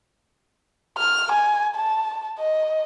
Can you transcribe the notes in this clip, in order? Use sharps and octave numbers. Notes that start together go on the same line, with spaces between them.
F6
G#5
A5
D#5